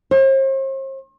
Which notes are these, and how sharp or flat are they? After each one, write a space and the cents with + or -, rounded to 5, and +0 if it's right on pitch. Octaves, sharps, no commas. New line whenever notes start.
C5 +45